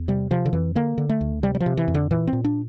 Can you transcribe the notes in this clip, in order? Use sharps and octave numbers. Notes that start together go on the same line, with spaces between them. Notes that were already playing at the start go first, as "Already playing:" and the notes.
Already playing: E2
C3 G3
C3 F3
D3
F2 E3
D3 A#3
D3
A3
D2
C3 G3
G3
F3
C3
E3
F2
D3
A#2 E3
C4
A#2
D4